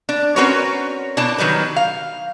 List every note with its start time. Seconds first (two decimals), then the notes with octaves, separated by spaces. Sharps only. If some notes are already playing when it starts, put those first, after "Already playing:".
0.09 D4
0.36 C4 C#4 F#4 A#4 B4 C#5
1.17 B2 D4 E4 A5
1.38 D#3 F#3 G3 B4
1.76 F5